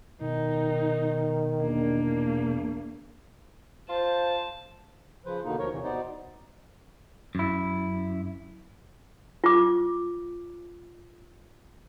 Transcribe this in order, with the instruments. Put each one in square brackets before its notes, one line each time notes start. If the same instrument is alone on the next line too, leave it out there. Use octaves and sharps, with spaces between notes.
[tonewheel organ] B2 [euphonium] D#3 [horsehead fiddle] D#4
[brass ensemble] E2 D4 [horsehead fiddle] A#3
[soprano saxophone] F4 [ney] C5 [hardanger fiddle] A5
[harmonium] C#3 F3 B4 C5
B2 D3 D#3 A#3 D#4
D2 F3 A#4 C#5
E2 C3 E3
B2 B3 D#4 C5 D5
[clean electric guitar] F#2 E4
[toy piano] F4 D6